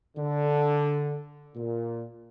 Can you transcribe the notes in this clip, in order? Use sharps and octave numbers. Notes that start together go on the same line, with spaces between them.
D3
A#2